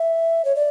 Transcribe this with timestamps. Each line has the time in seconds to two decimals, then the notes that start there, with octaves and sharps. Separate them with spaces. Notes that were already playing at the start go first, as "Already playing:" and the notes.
Already playing: E5
0.45 C#5
0.56 D5